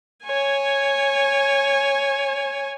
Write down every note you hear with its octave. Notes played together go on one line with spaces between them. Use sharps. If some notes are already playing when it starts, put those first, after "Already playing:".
C#5 G#5